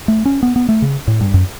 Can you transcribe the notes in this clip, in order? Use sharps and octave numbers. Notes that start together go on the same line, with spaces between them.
A3
C#4
B3
B3
A3
C#3
A2
G2
F#2